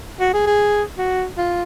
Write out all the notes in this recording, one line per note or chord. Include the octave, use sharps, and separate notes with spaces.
F#4
G#4
G#4
F#4
F4